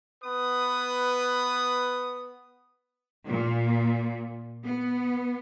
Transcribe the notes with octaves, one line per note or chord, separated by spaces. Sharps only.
B3 B4 D#6
A#2
B3